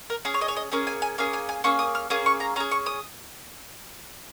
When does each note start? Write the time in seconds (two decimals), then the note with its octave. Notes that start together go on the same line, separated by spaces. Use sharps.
0.10 A#4
0.25 C#4 G#4
0.34 C#5
0.41 D#5
0.48 C#5
0.56 D#5
0.72 A#3 C#4 G#4
0.87 G#5
1.02 G#5
1.18 A#3 C#4 G#4 F5
1.33 G#5
1.49 G#5
1.64 A#3 C#4 G#4 C#6
1.79 D#6
1.95 F6
2.10 A#3 C#4 G#4 D#6
2.26 C#6
2.40 A#5
2.56 C#4 A#5
2.60 G#4
2.71 C#6
2.86 D#6